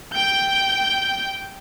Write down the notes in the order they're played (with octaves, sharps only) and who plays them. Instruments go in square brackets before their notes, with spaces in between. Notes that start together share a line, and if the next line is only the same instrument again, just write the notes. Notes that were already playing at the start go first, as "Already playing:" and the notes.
[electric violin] G5 G6